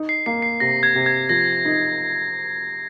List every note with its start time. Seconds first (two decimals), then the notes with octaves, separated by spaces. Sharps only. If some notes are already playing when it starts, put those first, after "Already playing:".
Already playing: D#4
0.09 C7
0.26 A#3 C7
0.42 C7
0.60 C3 A#6
0.83 G#6
0.95 C3
1.06 G#6
1.29 F3 A#6
1.65 D#4